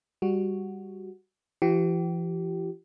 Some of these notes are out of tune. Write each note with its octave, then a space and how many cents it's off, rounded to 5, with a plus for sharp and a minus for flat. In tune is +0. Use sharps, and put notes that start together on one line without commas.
G3 +15 F#4 +0
E3 +45 G4 -30